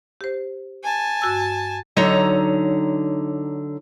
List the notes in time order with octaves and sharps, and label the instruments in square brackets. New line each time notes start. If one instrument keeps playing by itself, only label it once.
[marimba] G4 C5
[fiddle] G#5 A5
[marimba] G2 F#4 E6
[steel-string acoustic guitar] D3 F#3 D#4 C#5 A#5